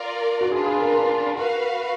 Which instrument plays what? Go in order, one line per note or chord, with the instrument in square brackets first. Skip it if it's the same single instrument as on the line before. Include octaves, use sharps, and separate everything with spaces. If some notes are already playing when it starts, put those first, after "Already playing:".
Already playing: [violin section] F4 A#4 D5
[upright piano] F#4
[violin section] D4 F4 B4 [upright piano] G#4
[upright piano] G#4
A#4
A#4
[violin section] F#4 B4 F5 [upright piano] A#4